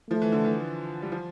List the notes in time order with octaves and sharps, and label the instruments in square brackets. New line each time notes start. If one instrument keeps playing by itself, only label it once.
[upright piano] F3 [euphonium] A3
[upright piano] E3
D3
E3
G3
F3